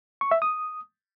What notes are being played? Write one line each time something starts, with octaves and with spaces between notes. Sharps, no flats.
C#6
E5
D#6